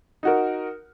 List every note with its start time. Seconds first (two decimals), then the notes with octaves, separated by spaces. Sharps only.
0.23 D#4 F#4 A#4